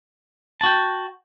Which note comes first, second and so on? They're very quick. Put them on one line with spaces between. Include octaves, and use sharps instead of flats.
A5 F#4 G5